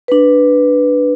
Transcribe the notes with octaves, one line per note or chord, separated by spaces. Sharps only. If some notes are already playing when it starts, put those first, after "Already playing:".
D4 B4